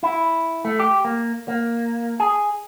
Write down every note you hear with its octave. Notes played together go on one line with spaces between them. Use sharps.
E4
A3
G4
A#3
A#3
G#4